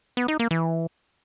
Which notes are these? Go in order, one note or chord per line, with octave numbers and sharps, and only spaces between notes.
B3
D#4
A#3
E3